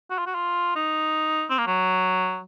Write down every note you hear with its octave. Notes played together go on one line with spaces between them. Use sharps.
F#4
F4
F#4
F4
D#4
C4
A#3
F#3